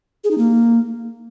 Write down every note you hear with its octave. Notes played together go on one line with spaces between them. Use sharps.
G#4
D#4
A#3